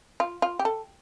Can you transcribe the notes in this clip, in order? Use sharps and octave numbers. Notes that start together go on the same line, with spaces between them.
F4
F4
G4
A4